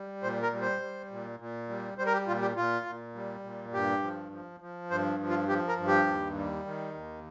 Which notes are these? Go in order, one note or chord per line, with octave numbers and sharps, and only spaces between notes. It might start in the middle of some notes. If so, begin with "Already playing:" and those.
Already playing: G3
A#2 C5
A#4
G3
C5
G3
A#2
A#2
G3
G3 C5
A#4
G4
A#2 F4
G4
A#2 F4
A#2
G3
A#2
G2 G4
F3
F3
F3
G2 C5
F3
F4
F3 G4
A#4
G2
G4
D#2
G3
D#3
D#2